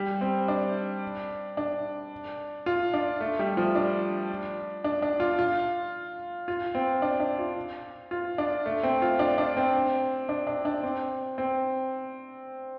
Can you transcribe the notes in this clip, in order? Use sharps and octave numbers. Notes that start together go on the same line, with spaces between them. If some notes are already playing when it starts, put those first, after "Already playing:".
Already playing: G3
C4
D4
D4
F4
D4
A3
G3
F3
D4
D4
D4
F4
F4
F4
C4
D4
D4
F4
F4
D4
A3
C4
F4
D4
D4
C4
D4
D4
D4
C4
C4